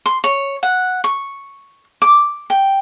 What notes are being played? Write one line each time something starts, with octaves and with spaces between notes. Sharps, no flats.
C6
C#5
F#5
C#6
D6
G5